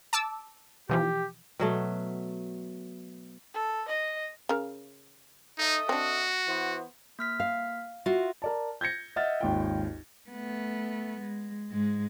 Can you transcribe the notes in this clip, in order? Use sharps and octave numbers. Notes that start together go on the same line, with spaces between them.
A5 D6 E6
B2 E3 F3 G4
B2 F#3 A3
A4
D#5
C#3 A#4
D#4 A4 D#5 E5
C4 D4 F#4
E3 B3 C5
A#3 F6 B6
F5
F4 F#4 E5
A#4 D5 A5
G6 G#6 A#6 C#7
D#5 E5 F#5 F6 A6
G#1 D#2 F4 G5
A3 B3
G#3
G#2 G#3